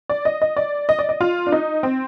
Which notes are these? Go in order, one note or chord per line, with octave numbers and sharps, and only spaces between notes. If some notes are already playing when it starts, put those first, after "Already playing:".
D5
D#5
D#5
D5
D#5
D5
D#5
F4
D4
D#4
C4